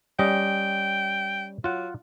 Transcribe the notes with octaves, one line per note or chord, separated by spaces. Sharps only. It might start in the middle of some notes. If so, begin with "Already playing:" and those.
G3 C#4 D#5 G5
F#3 F4 F#5